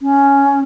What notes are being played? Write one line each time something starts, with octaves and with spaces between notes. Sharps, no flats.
C#4